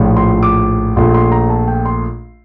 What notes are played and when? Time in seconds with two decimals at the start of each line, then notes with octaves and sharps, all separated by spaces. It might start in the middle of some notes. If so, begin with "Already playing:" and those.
Already playing: A#1 A2 F3
0.17 C6
0.43 D6
0.96 A#1 A#2 A3 C6
1.14 C6
1.32 A#5
1.50 A5
1.68 G5
1.85 C6